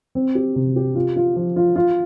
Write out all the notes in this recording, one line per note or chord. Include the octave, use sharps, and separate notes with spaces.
C4
G4
C3
G4
F4
F4
F3
F4
F4